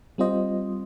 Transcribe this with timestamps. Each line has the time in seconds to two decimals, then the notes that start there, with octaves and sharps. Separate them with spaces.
0.18 G3 C4 F4 C5 D#5